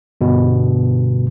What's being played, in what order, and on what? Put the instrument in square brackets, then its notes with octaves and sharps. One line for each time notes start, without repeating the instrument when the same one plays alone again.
[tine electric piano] G1 B2